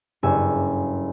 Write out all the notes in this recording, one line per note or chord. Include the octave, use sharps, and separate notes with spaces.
F#1 G2 G#5 E6